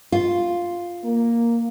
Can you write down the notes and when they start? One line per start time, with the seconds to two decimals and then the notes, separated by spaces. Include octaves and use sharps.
0.12 F4
1.04 A#3